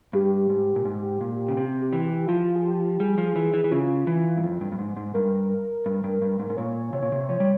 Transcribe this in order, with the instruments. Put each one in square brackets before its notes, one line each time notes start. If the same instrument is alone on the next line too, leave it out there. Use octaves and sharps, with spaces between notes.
[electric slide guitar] G2 [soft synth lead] G4
[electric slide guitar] G#2
A#2
G#2
A#2
C#3
C3
[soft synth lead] G4
[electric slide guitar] E3
[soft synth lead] G4
[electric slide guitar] F3 [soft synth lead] F4
[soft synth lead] G#4
G4
[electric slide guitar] G3 [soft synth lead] G#4
[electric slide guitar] F3
E3
E3
E3
[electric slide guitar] C#3 [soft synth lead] F4
[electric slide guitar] E3
G2
F2
G2
G2
G#2
G#2
[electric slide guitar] G2 [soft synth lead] A#4
[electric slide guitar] G2
G2
G2
G#2
G#2
[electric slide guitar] A#2 [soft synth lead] C#5
[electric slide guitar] C3 [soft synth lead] C#5
[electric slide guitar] A#2
C3
[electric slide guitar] F3 [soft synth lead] C#5
[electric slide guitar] G3